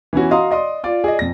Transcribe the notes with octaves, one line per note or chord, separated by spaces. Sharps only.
E3 B3 C#4 F#4
F#4 D#5 F5 A#5 C6 D#6
D5 D#5 C6 D#6
F4 D5
G#4 D5 D#5
F2 A#6